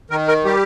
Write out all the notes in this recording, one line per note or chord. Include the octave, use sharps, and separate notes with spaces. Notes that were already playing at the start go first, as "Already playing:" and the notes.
D#3 A#4
A#4
G3 G4